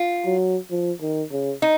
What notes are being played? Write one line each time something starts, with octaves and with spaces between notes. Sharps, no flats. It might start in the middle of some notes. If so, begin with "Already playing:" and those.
Already playing: F4
F#3
F3
D#3
C#3
D#4